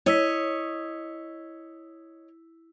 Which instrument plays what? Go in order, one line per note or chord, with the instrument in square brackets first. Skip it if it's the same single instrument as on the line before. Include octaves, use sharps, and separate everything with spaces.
[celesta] E4 E6 B6 [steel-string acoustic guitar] C#5 D#5